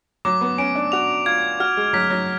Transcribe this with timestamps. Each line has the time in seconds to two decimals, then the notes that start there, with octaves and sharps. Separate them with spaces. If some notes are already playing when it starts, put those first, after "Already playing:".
0.25 F#3 D6
0.41 B3
0.58 C#4 D7
0.75 D4
0.92 F#4 F7
1.26 F4 G#6
1.60 F#4 F6
1.77 G#3
1.93 F#3 B6
2.10 F#3